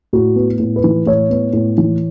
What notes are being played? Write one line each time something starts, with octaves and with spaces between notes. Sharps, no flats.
A2 F#4
B3
A2
B4
E3
A2 C#5
B3
A2
E3